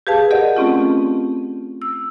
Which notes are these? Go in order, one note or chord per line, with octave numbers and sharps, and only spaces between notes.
G4 G#4 B4 F5 A5
G4 A#4 D5 D#5 F#5
A3 C4 C#4 F4
E6